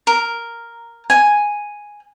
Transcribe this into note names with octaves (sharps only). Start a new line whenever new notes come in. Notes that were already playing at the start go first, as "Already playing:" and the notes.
A#4
G#5